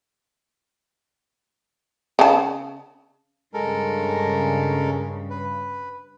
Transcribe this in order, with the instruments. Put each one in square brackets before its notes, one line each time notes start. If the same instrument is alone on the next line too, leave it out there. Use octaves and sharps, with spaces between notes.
[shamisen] C#3 A5
[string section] G2 C#3 [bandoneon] G#3 A4 A#4
[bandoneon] B4